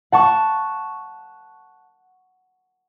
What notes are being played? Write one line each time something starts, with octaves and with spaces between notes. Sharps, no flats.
F#5 A5 C#6